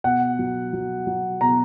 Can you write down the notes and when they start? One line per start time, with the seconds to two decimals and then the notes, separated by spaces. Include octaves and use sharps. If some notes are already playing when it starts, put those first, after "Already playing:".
0.04 B2 F#5
0.39 F#3
0.73 F#3
1.07 F#3
1.41 B2 A#5